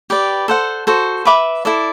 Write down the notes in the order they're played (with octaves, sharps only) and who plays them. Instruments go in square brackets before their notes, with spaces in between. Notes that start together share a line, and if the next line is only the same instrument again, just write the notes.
[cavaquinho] G4 B4 D5
A4 C5 F#5
F#4 A4 C5
B4 E5 B5 D6
E4 A4 D5